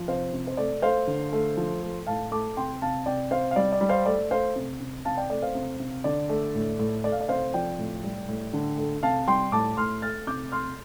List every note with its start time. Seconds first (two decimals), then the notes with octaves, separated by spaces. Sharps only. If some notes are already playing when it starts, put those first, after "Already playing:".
Already playing: F3
0.08 C3 C5 F5
0.33 C3
0.47 C5
0.57 A3 D5
0.82 A3 C5 F5
1.07 D3
1.33 A3
1.57 F3
1.83 A3
2.07 A2 F5 A5
2.32 A3 A5 D6
2.57 C3 G5 C6
2.82 C3 F5 A5
3.06 C3 D5 G5
3.31 C3 C5 F5
3.51 F5
3.56 G3 D5
3.72 D5
3.81 G3
3.89 C5 F5
4.06 A3 D5
4.31 A3 C5 F5
4.56 C3
4.80 C3
5.05 C3 F5 A5
5.17 D5 G5
5.30 A3 D5
5.42 C5 F5
5.55 C3
5.80 C3
6.04 D3 D5
6.29 A3
6.55 A2
6.79 A2
7.04 A3 D5
7.12 F5
7.21 D5
7.28 C3 C5 F5
7.54 F3 D5 G5
7.79 A2
8.04 G3
8.28 A2
8.53 D3
8.78 A3
9.03 C3 F5 A5
9.28 G3 G5 C6
9.52 A2 A5 D6
9.77 A2 C6 F6
10.02 A3 F6 A6
10.27 C3 D6 G6
10.52 A3 C6 F6